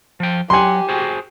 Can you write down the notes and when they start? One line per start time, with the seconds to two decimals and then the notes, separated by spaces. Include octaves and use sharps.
0.20 F3 G5
0.50 F#3 G4 F#5 G#5 C6
0.89 F#4 G#4 C5